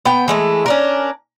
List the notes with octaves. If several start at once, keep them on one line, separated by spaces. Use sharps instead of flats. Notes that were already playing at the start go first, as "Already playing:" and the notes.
B3 G5
E3 G#3 A3
C#4 D4 A#4